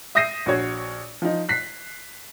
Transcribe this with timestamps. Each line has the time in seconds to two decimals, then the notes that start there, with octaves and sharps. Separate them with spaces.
0.15 E5 D#6 G6 A#6 C7 D#7
0.46 A#1 F#4 C#5 G#6
1.22 F3 D#4
1.49 F#6 B6 C7